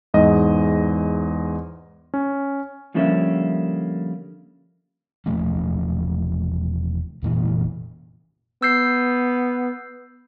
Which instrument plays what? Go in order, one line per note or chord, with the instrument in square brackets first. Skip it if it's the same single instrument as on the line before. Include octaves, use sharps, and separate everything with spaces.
[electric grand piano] E2 G#2 D#5
C#4
[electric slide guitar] D3 F3 G3 A#3 C#4 E5
[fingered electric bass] E1 F3 A3 C#4
F1 A#2 E3
[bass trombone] B3 [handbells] E6 G6 C7